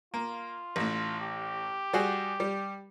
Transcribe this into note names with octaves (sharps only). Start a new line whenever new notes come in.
A#3 F4
A1 A2
G4
G3 F#4 G#4
G3